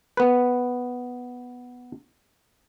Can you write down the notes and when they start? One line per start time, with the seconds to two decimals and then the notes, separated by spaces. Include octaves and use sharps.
0.17 B3 B4